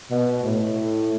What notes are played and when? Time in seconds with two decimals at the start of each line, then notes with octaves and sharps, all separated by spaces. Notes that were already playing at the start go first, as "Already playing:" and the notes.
0.11 B2
0.43 A2